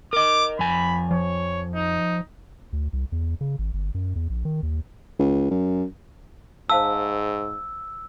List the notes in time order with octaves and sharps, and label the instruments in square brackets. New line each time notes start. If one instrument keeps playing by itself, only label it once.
[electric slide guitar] A#4 D#5 [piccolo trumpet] D6
[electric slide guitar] F2 G#5 [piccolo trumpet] B5
[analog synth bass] F3 [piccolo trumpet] C#5
[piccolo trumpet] D#4
[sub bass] D2
C2
E2
C#3
G#1
G1
F#2
E2
A#1
D#3
D#2
[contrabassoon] C#2
F#2
[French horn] G#2 [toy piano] C5 F5 A5 [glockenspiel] E6